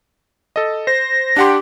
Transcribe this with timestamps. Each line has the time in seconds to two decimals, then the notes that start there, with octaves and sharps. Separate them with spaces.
0.56 A4 D#5
0.87 C5 A#6
1.37 D4 G4 F#5 C6